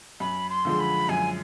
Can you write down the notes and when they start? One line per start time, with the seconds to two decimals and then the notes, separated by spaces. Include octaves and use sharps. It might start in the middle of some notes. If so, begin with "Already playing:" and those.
0.20 F#2 B5
0.50 C6
0.65 D3 F3 G#3
0.80 B5
1.09 F#2 G#5